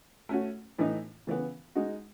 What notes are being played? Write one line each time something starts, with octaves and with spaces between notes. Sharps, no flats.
A3 C#4 F#4
A2 E3 A3 D#4
C#3 E3 B3
G#3 D#4 F#4